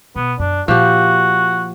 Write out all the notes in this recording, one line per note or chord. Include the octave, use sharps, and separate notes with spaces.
B2 B3
F#2 D4
A#2 F3 F#4 G4